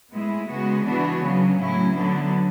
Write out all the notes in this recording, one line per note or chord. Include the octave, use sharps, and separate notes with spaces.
A2 G#3 B3 E4
C#3 G#3 B3 F#4
E3 B3 D4 F#4
C#3 F#3 B3
A2 F#3 C#4 E4
D3 F#3 B3 D4